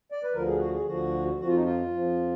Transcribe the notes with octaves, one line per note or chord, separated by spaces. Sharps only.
D5
B4
D2 D3 F3 A#4
G#4
F#4
G#4
D2 D3 F3 F#4
F2 F3 F#4
F4
D#4
F4
F2 F3